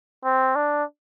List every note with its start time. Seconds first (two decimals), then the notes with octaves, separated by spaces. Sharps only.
0.24 C4
0.55 D4